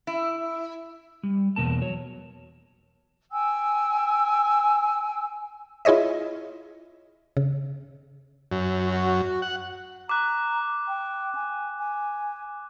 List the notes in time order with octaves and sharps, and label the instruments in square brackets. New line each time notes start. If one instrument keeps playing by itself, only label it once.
[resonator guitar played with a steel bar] E4
[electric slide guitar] G3
E2 G#2 B2 A#3 A5
F#3 C#5
[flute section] G5 G#5 E6
[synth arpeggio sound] E4 F4 G#4 C#5 D#5 E5
C#3
[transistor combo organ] F#2
[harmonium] F#4
[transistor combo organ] F#5
[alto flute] A#5 [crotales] D6 F#6
[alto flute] G5
G#5
G#5